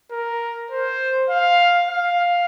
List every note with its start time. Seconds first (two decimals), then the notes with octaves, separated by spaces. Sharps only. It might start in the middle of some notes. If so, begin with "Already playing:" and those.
0.11 A#4
0.71 C5
1.30 F5
1.89 F5